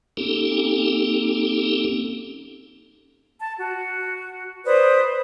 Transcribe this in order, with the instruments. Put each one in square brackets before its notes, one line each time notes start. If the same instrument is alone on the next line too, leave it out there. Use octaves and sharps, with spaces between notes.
[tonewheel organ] A#3 C4 C#4 D#4 G4 A4
[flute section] A5
F#4
B4 C5 D5 D#6